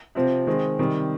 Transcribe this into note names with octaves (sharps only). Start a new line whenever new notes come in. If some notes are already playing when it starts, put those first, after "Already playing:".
C3 F3 C4
D#3 G#3 C4
C3 D#3 G3